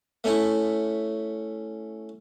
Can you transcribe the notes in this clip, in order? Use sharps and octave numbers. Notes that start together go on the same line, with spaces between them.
A3 C#4 E4